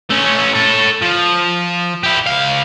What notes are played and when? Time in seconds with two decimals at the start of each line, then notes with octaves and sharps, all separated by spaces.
0.10 A3 C#4
0.54 A4 C#5
1.02 F3
2.03 E4 G4
2.26 C#2 F5